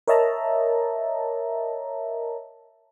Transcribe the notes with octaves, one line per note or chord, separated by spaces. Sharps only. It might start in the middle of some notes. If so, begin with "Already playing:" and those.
A#4 C#5 D#5 E5 A5 A#5